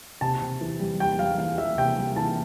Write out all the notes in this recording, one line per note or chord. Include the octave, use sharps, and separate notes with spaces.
C3 A5
C3
E3
G3
G3 G5
G3 F5
E3 F5
E3 E5
C3 G5
G3
E3 A5